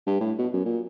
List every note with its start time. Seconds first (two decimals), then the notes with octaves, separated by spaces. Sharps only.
0.07 G2
0.20 A2
0.38 B2
0.53 F#2
0.65 A#2